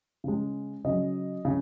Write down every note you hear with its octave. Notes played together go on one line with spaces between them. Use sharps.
C#3 G#3
C#3 F#3 D#5
C#3